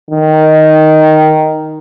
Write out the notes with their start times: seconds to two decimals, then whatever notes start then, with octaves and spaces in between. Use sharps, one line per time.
0.11 D#3